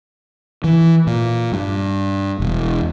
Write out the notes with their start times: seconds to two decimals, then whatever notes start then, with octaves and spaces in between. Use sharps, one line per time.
0.64 E3
1.07 A#2
1.52 G2
2.40 E1